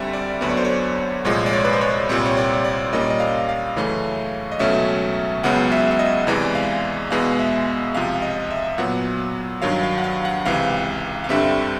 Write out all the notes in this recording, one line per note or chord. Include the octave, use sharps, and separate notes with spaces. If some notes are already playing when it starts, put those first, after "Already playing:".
Already playing: D2 D3 G3 C4 E5
D5
D2 D3 F#3 B3 D5
C#5
C5
C#5
C2 A#2 F3 G#3 C#5
D5
C#5
B4
C5
C#5
C2 A#2 G3 C4 C#5
C#5
D5
D5
A#2 G3 A#3 C#4 D#5
D5
D#5
F5
F5
F#2 C#3 E3 A3 C#4
D#5
C#2 B2 F#3 A3 C#4 E5
C#2 C#3 F#3 B3 F#5
E5
E5
D#5
E2 C3 E3 G#3 D5
F5
E2 B2 G#3 B3 F5
E5
C#2 C3 F3 F5
D#5
E5
A#2 F#3 B3 F#5
G2 D#3 F#3 F5
F5
F#5
F5
F#5
C#2 C3 E3 F5
F5
G2 D3 G3 C4 E5